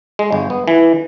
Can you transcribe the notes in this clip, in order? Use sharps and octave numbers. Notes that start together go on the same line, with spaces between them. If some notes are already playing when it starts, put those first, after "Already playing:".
G#3
G1
B3
E3